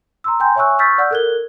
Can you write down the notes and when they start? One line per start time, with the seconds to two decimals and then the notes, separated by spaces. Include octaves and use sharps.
0.24 A#5 C6 E6
0.40 G5 G#5 A#5 C6 G6
0.56 C#5 E5 G#5 C#6 E6 F#6
0.79 C#6 E6 F6 G6 A6 B6
0.98 D5 F#5 E6 F6 G6
1.11 A4 A#4 F#6 G#6 G7